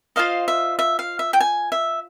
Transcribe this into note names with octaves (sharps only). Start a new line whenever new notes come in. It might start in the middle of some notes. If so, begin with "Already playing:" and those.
F4 A4 C5 D#5 F5
E5
E5
F5
E5
G5
G#5
E5